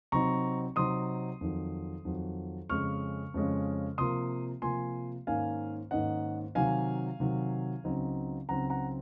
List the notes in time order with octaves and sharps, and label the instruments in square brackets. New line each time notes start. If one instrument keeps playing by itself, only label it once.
[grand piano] C3 F#3 C4 D#4 A#5 C#6
C3 F#3 C4 D#4 C6 D#6
F2 D#3 F#3
F2 D#3 F#3
F2 C#3 G#3 C#4 C#6 F6
F2 C#3 G#3 C#4
C3 F3 A#3 C6 D#6
C3 F3 A#3 G#5 C6
G#2 D#3 A#3 C#4 F5 G#5
G#2 D#3 A#3 C#4 D#5 F#5
C3 D#3 F#3 F5 G#5
C3 D#3 F#3
C#2 C#3 F#3 C4 D#4
C#2 C#3 F#3 C4 D#4 F#5 A#5
F#5 A#5